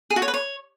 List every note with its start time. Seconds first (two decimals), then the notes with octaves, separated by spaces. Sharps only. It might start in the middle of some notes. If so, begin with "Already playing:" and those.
0.10 G#4
0.16 F#4
0.22 C#5
0.28 B4
0.34 C#5